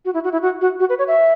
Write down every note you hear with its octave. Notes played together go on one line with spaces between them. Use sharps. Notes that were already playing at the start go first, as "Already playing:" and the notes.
F#4
E4
F#4
E4
F#4
F#4
F#4
B4
C#5
E5